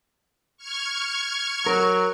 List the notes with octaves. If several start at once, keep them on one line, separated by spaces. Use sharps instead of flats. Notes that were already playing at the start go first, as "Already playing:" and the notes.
C#6 F6 G#6
F#3 A#4